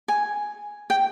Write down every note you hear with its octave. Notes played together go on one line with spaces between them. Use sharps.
G#5
G5